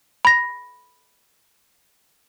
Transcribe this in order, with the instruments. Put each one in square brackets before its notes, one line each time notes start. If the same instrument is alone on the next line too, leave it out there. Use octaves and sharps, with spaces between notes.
[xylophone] B5 A#6